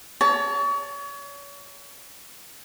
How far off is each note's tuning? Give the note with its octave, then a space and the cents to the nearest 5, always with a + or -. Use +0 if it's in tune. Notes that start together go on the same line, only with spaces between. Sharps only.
C#5 +35 A5 +0